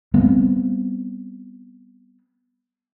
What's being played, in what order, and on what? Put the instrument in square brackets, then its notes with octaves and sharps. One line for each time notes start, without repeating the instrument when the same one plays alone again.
[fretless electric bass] G3 B3 C4